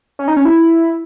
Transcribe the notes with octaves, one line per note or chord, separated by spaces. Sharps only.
C#4
D#4
C#4
E4